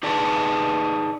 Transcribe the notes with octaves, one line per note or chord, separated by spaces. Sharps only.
D#4 G#4 B4 D5 A5